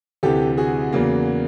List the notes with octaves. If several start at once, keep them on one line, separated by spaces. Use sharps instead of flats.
D2 C3 E3 G4 A4
F#4 G#4
E2 C#3 F#3 A#3